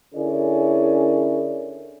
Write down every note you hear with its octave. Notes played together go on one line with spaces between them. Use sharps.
D3 C#4 E4 G#4 A#4 D5